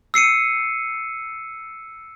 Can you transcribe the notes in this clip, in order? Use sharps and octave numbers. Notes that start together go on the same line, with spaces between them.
E6 C7 C#7 D#7